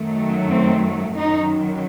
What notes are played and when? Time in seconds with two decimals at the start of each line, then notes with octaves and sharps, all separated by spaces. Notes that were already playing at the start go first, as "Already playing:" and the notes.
Already playing: F#2 D#3 F#3 A3
0.50 C4
1.16 F#2 D#3 F#3 D#4